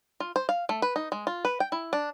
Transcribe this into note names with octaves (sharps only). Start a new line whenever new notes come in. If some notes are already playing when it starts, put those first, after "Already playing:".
F4
C5
F5
A3
B4
D#4
G#3
F4
B4
G5
E4
D4